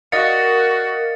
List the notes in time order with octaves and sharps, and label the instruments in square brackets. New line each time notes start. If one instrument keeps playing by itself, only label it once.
[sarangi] F#4 [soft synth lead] A#4 [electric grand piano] D5 D#5 F5 [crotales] A6 C#7